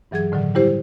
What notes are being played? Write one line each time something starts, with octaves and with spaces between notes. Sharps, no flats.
G2 E3 F#3 G#4 G#6
A2 D3 D#3 F#3
G3 E4 G4 C5